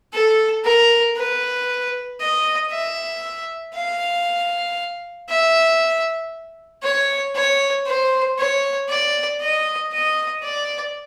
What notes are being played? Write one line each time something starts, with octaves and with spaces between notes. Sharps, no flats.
A4
A#4
B4
D#5
E5
F5
E5
C#5
C#5
C5
C#5
D5
D#5
D#5
D5